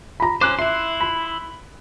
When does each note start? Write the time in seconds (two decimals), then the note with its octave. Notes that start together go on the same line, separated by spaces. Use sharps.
0.20 A#5 B5
0.41 C#4 C5 D6 F#6
0.59 E4 E5 C6
1.01 B5